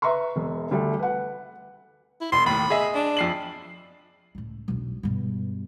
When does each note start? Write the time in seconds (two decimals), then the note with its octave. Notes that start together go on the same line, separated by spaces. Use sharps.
0.02 B4 E5 A#5 C6 C#6
0.36 E1
0.71 D2 G3 A3
0.99 B4 F#5
2.21 E4
2.32 E1 B5 C6
2.46 D#2 A2 B5
2.70 G#4 D#5 E5
2.95 D4
3.17 F2 C7 F#7
4.35 C#2 A2
4.68 E1 B1
5.03 G2 B2